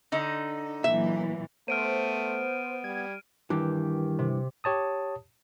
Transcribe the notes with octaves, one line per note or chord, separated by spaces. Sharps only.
D3 D#4
A#2 E3 F#3 E5
A3 B3 C5 F6 D7 D#7
G3 G#6
G2 D#3 E3 G4
C3
G4 C#5 A5 D#6